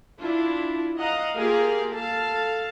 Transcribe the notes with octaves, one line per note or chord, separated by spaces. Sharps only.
D4 E4 F4
D#5 F5 F#5 A#5
A#3 F4 G4 G#4 A#4 F5
A4 F5 A5